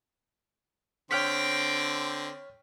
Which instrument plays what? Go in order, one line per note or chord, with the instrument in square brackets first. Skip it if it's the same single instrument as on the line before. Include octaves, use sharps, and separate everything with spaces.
[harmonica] D3 C4 [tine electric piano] C#5 F6 B6 [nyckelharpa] G5